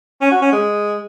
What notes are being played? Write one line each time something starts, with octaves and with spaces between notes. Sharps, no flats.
C#4
F#4
C#4
G#3